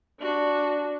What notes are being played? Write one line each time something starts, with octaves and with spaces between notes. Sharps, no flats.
D4 F#4